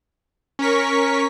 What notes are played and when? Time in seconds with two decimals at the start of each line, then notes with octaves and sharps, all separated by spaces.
0.59 C#4 A#4 C#6 B6